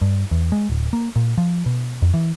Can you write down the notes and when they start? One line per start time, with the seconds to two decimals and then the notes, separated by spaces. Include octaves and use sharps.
0.02 G2
0.31 E2
0.52 G#3
0.70 D1
0.93 A#3
1.16 A#2
1.38 F3
1.66 B2
2.02 F2
2.14 E3